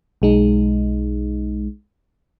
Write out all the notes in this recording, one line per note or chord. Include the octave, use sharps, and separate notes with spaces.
B1 G#3 D#4